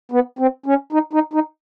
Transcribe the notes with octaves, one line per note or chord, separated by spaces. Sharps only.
B3
C4
C#4
D#4
D#4
D#4